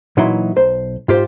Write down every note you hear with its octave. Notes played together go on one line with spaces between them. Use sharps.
A#2 E3 F#3 D#4 E4 C6
B1 C5
G#2 F4 G4 C5